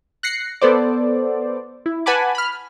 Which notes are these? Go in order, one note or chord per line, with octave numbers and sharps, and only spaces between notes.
F#6 A#6 C7 C#7
B3 A4 C5 D5
E4
B4 F#5 G#5 A5 B5 D6
B5 F6